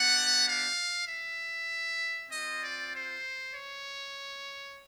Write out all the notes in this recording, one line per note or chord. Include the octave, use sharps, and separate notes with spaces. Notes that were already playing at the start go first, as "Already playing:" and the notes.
Already playing: B3 D4 G4 F#5
F5
E5
C4 F4 D#5
D5
C5
C#5